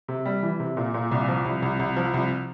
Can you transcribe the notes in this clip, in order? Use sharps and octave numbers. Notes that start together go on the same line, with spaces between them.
C3
G3
E3
C3
A#2
A#2
C2
F3
C2
C2
C2
F3
C2